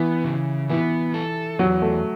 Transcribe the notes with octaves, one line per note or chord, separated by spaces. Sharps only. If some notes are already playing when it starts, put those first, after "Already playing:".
Already playing: E3 B3
C#3
E3 B3
A4
E2 F#3
A3